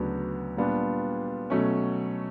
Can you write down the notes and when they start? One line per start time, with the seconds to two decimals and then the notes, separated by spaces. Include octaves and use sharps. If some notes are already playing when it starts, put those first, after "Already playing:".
Already playing: D2 C#3 F#3 B3 D4
0.57 A#2 G3 B3 D4 F4
1.50 B2 F#3 A3 C#4